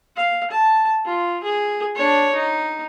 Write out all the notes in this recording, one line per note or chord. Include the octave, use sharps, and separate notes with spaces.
F5
A5
F4
G#4
D4 C#5
D#4